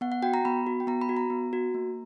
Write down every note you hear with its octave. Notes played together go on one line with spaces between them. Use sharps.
B3 F#5
F#5
F#4 G5
A#5
B3 B5
F#4
G5
B3 A#5
B5
F#4
A#5
B3
F#4
A#3